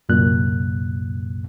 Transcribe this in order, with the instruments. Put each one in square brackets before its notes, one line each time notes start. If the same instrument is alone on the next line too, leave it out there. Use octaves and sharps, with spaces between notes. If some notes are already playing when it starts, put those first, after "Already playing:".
[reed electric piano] C2 F#2 A#2 F#6